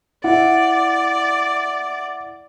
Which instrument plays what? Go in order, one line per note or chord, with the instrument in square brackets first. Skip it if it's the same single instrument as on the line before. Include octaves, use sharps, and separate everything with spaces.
[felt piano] E4 [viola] D5 [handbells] F#5